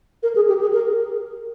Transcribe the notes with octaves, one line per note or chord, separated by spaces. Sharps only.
A#4
G#4
G4
G#4
A#4